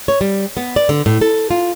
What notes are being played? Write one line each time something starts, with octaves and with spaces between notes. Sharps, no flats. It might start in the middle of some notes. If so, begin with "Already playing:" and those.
C#5
G3
B3
D5
D3
A2
A4
F4